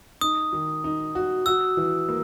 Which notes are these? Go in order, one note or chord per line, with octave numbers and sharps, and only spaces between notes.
D#4 D#6
D#3
D#4
F#4
F#4 E6
E3
A#3